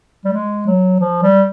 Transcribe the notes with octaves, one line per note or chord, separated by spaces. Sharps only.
G3
G#3
F#3
F3
G3